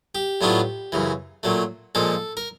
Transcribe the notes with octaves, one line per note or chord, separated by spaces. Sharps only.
G4
A2 F#3 B3 D4 F4
F#2 C#3 E3
A#2 F#3 A3
A#2 F3 G#3 A4
A#4